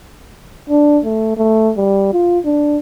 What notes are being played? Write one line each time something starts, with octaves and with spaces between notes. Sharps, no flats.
D4
A3
A3
G3
F4
D4